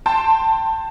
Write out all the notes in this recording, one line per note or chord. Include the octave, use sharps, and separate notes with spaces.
G5 A5 C6